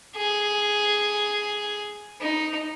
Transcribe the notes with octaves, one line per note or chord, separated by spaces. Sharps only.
G#4
D#4